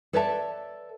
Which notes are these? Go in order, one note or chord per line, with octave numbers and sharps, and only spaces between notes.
A4 B4 C#5 D5 E5 A5